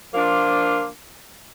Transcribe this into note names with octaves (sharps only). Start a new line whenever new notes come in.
F3 A#3 D4 F4